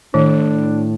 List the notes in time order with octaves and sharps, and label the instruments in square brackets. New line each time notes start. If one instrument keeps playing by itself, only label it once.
[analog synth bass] A2 [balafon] D#3 [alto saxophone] D4